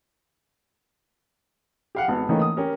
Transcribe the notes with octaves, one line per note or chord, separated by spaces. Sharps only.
G4 F5 F#5
G#1 B3
D#3 E3 A3 A#3 C#4
D#6
C#4 G4 A#4